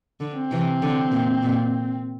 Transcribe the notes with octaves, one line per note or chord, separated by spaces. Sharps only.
D3
C4
C3 E3
D3
A#2
A#2